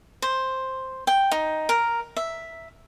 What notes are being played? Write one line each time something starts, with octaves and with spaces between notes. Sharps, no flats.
C5
G5
D#4
A#4
E5